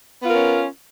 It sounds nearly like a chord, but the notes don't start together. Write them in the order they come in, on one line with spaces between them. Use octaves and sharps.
B3 F4 A#4 C#4